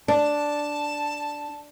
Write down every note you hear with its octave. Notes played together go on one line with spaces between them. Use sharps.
D4 A5